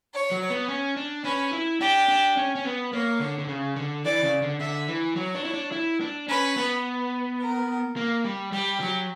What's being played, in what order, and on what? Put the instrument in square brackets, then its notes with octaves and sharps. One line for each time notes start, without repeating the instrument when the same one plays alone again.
[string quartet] C#5
[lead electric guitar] F#3
B3
C#4
D4
[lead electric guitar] C#4 [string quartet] B4
[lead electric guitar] E4
[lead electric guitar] D4 [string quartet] G4
[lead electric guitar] D4
C#4
C#4
B3
[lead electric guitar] A#3 [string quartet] C#5
[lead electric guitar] D3
D3
C#3
D3
[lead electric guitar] E3 [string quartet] D5
[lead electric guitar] C#3
D3
[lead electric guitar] D3 [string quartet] E5
[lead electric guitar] E3
[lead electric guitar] F#3 [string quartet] C#5
[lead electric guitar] D4
E4
D4
E4
D4
[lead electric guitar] C#4 [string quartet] B4
[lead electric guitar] B3
[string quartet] A#4
[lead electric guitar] A#3
G3
[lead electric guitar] G3 [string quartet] G4
[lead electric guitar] F#3